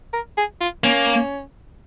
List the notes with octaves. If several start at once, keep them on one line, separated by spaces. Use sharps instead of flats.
A#4
G#4
F4
A#3 C#4